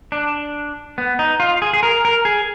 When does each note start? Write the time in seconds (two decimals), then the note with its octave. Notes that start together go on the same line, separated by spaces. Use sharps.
0.12 D4
0.98 B3
1.19 D#4
1.40 F4
1.62 G#4
1.73 G#4
1.83 A#4
2.05 A#4
2.25 G#4